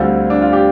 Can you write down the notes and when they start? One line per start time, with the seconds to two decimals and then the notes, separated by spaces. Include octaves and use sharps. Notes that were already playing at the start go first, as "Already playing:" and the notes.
Already playing: D2 D3 G3 C4 F4
0.30 D4
0.42 F4
0.53 G4